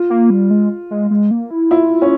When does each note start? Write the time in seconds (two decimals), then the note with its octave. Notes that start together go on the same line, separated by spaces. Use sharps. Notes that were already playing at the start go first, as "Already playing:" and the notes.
Already playing: F4
0.10 A#3
0.30 G3
0.51 G#3
0.91 G#3
1.11 G#3
1.31 A#3
1.51 E4
1.71 E4 F4
2.02 C#4